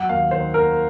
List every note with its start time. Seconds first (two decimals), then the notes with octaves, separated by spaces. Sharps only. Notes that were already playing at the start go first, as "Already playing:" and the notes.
Already playing: F#3 F#5
0.09 D#2 F5
0.31 D#3 C5
0.54 A#3 A#4